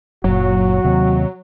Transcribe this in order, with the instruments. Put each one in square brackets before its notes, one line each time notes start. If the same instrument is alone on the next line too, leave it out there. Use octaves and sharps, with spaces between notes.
[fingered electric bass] F#1 A#2 [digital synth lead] F#3 [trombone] F#4
[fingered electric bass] D#2 C3